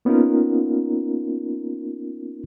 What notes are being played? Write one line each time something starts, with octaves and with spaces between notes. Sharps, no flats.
A#3 B3 C#4 D#4 F4 A#4